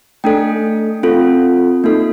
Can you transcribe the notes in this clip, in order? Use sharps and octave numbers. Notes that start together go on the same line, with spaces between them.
A3 D4 A4 G5
C4 F4 A4
A#3 D#4 A4